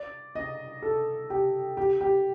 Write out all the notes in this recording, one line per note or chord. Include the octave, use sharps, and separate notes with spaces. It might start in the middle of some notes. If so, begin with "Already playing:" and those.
Already playing: D5
D#5
A4
G4
G4
G4